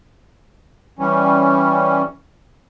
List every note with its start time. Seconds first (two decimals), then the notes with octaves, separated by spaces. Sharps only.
0.99 E3 G3 C#4